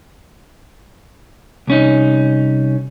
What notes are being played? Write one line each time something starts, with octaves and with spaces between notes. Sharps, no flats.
C2 C#4 D#4